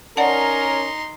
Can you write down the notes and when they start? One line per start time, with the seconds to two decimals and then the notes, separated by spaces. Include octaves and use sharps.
0.17 C#4 D#4 A#4 D5 F#5 A5 C6